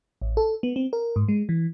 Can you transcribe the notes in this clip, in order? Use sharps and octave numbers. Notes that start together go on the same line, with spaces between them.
A1
A4
B3
C4
A#4
G#2
G#3
E3